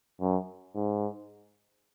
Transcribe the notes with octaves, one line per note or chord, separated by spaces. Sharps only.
F#2
G#2